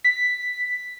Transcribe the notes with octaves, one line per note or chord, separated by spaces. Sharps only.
B6